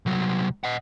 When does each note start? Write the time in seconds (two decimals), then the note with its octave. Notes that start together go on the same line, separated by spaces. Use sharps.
0.06 C2 F#3
0.64 D#5 F#5